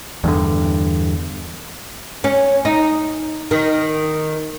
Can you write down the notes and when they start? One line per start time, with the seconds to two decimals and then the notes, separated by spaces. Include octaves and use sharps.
0.24 E2 G2 D3
2.24 C#4
2.65 D#4
3.51 D#3